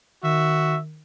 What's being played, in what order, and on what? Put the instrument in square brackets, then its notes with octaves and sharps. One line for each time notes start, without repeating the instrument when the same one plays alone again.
[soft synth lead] D#3 [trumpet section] F#4 E5